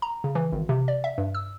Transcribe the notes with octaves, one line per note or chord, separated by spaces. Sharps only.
A#5
C#3
E3
G#1
C3
D5
E5
G2
E6